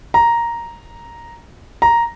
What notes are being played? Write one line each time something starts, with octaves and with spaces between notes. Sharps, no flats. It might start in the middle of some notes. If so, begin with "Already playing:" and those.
A#5
A#5